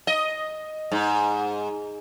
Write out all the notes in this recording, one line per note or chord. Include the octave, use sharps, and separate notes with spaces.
D#5
G#2